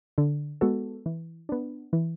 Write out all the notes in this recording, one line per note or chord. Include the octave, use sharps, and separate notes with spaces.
D3
G#3 B3 F#4 A4
E3
B3 D4
E3